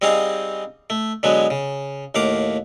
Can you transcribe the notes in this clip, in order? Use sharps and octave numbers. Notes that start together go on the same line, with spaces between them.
G3 C4 D#4 G#4 F5 F#5
A3
D3 F#3 G#3 B3
C#3
D#2 A2 F5 F#5 D6